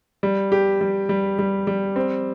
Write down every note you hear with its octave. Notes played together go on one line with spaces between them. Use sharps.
G3
G4
G3
G3
G3
G3
C4